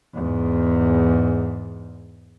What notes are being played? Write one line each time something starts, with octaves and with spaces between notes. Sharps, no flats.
E2 G#2